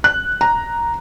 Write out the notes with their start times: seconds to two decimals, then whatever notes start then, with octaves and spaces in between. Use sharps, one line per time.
0.04 F#6
0.41 A#5